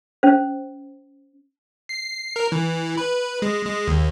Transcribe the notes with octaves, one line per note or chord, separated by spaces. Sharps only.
C#4 C5
C7
A#4
E3
B4
G#3
G#3
D#2